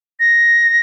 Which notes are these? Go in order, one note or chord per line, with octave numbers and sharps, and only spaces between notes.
A#6